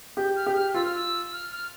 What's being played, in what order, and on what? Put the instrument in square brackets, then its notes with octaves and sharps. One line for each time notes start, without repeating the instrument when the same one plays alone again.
[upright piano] G4 [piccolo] G6
[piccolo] F6
[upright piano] G4 [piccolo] G6
[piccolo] F6
[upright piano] F4 [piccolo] E6
[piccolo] F6
E6
F6
F6